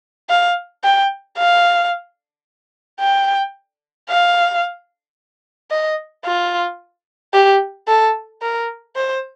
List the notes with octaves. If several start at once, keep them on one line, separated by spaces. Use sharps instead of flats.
F5
G5
F5
G5
F5
D#5
F4
G4
A4
A#4
C5